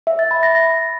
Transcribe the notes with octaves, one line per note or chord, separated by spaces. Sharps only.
E5
A6
B5
A#6
A#6